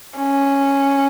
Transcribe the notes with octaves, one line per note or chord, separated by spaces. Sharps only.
C#4